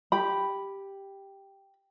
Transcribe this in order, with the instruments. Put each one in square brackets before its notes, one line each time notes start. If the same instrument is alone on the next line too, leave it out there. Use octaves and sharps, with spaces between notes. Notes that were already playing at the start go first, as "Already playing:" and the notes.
[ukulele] G4 B5